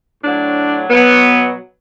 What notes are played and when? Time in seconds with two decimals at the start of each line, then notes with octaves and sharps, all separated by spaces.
0.23 A2 F#3 D4
0.89 B2 F#3 B3